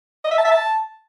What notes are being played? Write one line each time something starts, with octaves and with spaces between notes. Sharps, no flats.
D#5
E5
A5
E5
A5